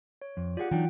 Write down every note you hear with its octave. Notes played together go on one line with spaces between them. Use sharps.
C#5
F2
F4 G4 G#4 D5 F#5
E3 F#3 D4 D#4 F4 G5